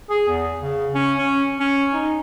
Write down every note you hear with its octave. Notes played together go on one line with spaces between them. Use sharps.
G#4
E2
C#3
C#4
C#4
C#4
D#4